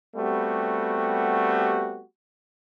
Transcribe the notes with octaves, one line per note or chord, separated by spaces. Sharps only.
G3 A3 B3 C4 F#4 G4